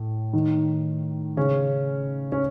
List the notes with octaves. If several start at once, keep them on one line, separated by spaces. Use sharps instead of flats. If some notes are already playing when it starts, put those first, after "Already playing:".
Already playing: A2 A3
D#3 D#4
C#3 C#4
C#4